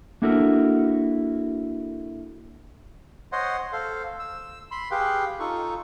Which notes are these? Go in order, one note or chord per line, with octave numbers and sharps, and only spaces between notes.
A#3 D4 E4 F#4 A4 A#4
C5 C#5 D#5 F#5 C6
A4 C5 F5
E6
B5 C6
G4 G#4 B4 F5 G5
D#4 F4 A4 C#6